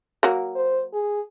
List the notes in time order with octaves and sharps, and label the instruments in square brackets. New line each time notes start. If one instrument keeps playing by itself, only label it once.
[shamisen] F#3 A#3
[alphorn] C5
G#4